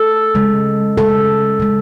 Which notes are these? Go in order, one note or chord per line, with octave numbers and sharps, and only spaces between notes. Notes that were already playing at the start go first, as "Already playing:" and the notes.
Already playing: A4
C#3 G#3
C#3 G#3 A4
C#3 G#3